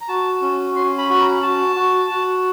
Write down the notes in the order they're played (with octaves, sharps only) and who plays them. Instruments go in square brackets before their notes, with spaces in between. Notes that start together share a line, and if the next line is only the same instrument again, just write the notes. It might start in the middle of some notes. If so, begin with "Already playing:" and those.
[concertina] A#5
F#4 A5
C#4
C#4 C6
B5
F#4 B5
A#5
F#4 A5
F#4
F#4